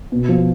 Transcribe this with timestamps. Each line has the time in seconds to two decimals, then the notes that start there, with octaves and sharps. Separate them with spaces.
0.12 B2
0.29 F3